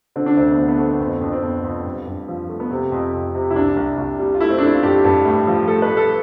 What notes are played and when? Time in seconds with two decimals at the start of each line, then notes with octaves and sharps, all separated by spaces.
0.16 D3 C4
0.26 D4
0.37 D2 C4
0.51 B3
0.57 D2 C4
0.68 B3
0.79 A3 C4
0.90 C4
1.00 F2 B3
1.11 C4
1.21 F2 D4
1.33 C4
1.43 F2 B3
1.64 F2
1.85 G2
2.06 G2
2.28 F3
2.49 A3
2.60 B3
2.71 C3 C4
2.92 F2
3.14 F2
3.35 C3
3.50 E4
3.56 C2 D4
3.77 C2
3.98 C2
4.19 G3
4.34 F4
4.41 A3 E4
4.50 C4
4.58 D4
4.62 A3 E4
4.74 F4
4.83 G2 G4
5.04 G2
5.25 A2
5.47 F3
5.68 A3 A4
5.82 B4
5.89 A3
5.97 A4